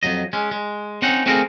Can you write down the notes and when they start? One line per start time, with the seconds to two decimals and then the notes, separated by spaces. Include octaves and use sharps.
0.03 F2 C3 F#3 D#5
0.33 G#3 C#4
0.51 G#3
1.02 C4 C#4 D#4 F#5
1.26 A3 C4 F#4 G#4 A#4